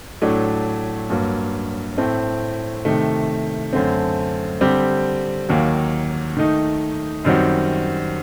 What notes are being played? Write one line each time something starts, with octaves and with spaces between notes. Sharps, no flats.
A2 F#3 A3 D4
G2 F#3 A#3
A2 A3 C4
C3 D#3 A3
F#2 D3 A3 C4
D3 G3 C4 G4
D#2 D#3 F#3 A#3
D#3 A3 D#4
F#2 D#3 G3 C4 F#4